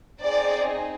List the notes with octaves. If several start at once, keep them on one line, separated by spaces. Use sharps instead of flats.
C4 D#4 G#4 D5